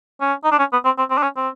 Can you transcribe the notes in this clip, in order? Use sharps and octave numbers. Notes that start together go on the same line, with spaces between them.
C#4
D#4
D4
C#4
B3
C4
C4
C4
D4
C#4
C4